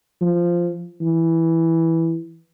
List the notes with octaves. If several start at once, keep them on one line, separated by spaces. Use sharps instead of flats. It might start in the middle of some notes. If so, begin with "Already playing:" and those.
F3
E3